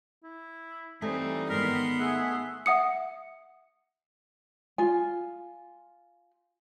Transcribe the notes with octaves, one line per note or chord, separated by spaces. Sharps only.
E4
E3 G3 A3 C4 D#4 G#5
G#2 D#3 B3 A#4 C6
A3 G#4 E5 F#5
E5 F#5 D#6 C#7
F4 G#5